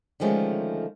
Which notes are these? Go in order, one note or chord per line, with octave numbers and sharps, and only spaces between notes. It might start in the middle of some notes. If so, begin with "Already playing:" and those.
D3 D#3 F3 G#3 A3 C#4